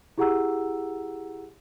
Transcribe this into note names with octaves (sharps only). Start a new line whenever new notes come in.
E4 G4 G#4 F#5 A#5 E6